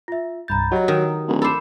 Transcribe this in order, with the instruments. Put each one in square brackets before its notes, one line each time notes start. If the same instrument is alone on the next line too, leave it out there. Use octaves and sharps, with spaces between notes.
[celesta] F4 E5
[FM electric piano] C2 G2 A6 [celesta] A#5 B5 G6
[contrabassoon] F#3 [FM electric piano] F#4 G4 A#5 [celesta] D#5
[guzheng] D#3 [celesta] D#6
[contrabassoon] D1
[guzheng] A4 C5 [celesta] B5 D6 E7